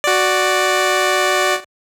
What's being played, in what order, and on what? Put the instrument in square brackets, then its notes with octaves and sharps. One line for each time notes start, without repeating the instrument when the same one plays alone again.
[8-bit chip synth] F#4 D5